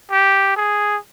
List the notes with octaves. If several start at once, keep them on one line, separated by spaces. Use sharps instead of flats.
G4
G#4